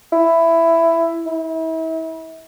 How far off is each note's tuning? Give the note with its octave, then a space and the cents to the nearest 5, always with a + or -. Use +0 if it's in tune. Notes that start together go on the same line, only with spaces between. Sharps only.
E4 +10
E4 -35